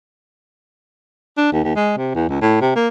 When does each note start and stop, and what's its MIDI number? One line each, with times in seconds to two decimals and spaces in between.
1.37 1.52 62
1.53 1.62 39
1.64 1.74 39
1.76 1.93 56
1.97 2.14 48
2.15 2.25 40
2.29 2.37 37
2.42 2.57 45
2.62 2.71 48
2.75 2.88 58